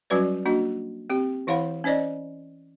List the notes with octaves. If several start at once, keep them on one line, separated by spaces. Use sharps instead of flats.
F#3 G3 C#4 F#4 B4 D5
A#3 D4 F#4 D#5
C4 G4
E3 E4 C#5 F5 F#5 B5
C#4 D#4 C5 D5 D#5